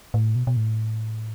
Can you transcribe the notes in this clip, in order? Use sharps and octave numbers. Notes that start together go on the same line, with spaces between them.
A2
B2
B2
A2